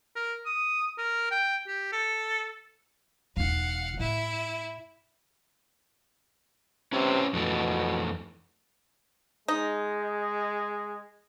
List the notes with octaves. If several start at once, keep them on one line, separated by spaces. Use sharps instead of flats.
A#4
D#6
A#4
G5
G4
A4
E1 D#4 F5 F#5
A2 E4 E5
C3 C#4 B4 C#5
F2 B2 E3 A3
G#3 D#4